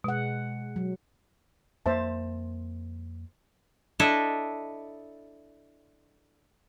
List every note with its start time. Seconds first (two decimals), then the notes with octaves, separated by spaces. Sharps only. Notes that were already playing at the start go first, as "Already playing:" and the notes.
0.04 B2 G#3 F#5
0.76 F#3
1.86 F2 A#3 C5 E5 A5
3.99 D4 E4 A4 D#5 E5